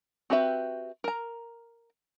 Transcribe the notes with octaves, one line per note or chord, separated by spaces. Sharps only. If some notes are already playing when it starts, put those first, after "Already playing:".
C4 F#4 G4 B4 E5
A#4 A#5